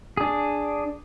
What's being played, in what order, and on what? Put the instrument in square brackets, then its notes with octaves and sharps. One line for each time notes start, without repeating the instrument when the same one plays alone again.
[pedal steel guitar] D4 G#4